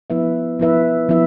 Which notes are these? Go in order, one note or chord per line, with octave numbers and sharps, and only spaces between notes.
F3 B3 E4 B4 E5
F3 B3 E4 B4 E5
F3 B3 E4 B4 E5